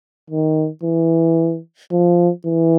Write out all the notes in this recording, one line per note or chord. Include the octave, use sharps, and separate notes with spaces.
D#3
E3
F3
E3